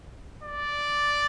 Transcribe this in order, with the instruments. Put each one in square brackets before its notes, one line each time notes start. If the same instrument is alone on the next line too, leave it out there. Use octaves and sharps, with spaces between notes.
[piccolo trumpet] D5